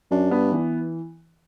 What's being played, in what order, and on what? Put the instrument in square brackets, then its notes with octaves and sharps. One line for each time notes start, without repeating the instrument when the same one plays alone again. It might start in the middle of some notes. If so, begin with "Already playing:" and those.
[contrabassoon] F#2 [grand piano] D4
[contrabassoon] G2 [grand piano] B3
[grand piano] E3